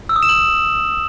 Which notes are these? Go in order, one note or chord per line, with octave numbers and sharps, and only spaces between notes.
E6
D#6
E7
F#7